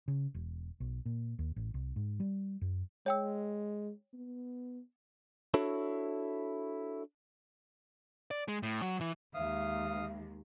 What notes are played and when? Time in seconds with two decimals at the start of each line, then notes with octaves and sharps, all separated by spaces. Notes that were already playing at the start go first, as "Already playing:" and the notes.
0.08 C#3
0.34 E1
0.80 B1
1.06 A#2
1.39 D#2
1.56 A1
1.74 C2
1.96 G#2
2.20 G3
2.61 F#2
3.06 G#3 C#5 G5 E6
4.13 B3
5.54 D4 E4 F#4 A4 C#5
8.31 D5
8.48 G#3
8.63 A2
8.82 F#3
9.01 E3
9.34 D#2 G#3 E5 F5 D#6